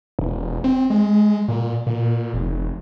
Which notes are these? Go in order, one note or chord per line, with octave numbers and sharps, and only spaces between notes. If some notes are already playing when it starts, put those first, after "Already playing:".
E1
C4
G#3
A#2
A#2
F1